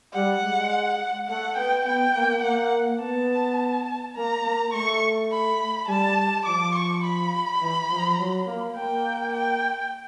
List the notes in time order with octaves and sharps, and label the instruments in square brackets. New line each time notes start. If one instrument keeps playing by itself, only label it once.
[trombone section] G3 [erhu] F#5
[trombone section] G#3
[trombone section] A3 [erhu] F#5
[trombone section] B3 [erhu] G5
[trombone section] B3 [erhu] G5
[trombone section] A#3
[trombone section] A#3 [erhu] F#5
[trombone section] B3 [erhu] A5
[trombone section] A#3 [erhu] A#5
[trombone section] A#3
[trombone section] A3 [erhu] C#6
[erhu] B5
[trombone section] G3 [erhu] A5
[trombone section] F3 [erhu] D6
[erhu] C#6
B5
[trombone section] E3
F3
F#3
A#3
[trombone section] A#3 [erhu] G5
[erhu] G5